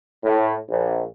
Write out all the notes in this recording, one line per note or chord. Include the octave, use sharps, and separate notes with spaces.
A2
A#1